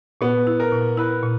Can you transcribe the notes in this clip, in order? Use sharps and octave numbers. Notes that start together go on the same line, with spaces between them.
A#2 B3
E4
A#4
A#2
E4 B4
A#2